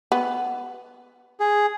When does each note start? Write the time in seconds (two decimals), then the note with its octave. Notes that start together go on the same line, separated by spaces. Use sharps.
0.12 B3
1.40 G#4